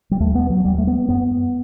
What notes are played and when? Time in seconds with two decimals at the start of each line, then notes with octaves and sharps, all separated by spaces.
0.11 G3
0.20 D#2 A3
0.35 B3
0.50 F#3
0.64 D#2 G3
0.78 A3
0.87 B3
1.09 F#2 B3